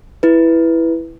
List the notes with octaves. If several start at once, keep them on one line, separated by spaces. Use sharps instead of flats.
E4 B4